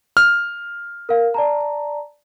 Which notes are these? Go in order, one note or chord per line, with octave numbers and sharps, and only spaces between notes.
F6
A#4 F5
D5 A5 A#5